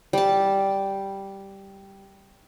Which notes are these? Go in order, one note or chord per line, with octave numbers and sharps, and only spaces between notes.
G3 A5